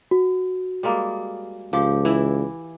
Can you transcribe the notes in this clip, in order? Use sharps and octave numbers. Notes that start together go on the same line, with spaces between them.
F#4
G3 G#3 A#3
C#2 F3 G4
E3 E4